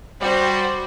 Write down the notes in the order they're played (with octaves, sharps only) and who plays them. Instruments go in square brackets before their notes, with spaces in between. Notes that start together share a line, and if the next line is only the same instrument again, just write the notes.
[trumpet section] G3 [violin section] F#4 C5